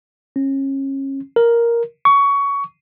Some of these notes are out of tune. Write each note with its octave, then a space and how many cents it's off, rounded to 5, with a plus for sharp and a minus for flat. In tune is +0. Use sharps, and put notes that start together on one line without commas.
C#4 -30
A#4 +5
C#6 +20